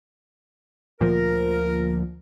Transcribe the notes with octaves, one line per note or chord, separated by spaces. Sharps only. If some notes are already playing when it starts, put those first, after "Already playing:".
D2 A#2 F3 A#4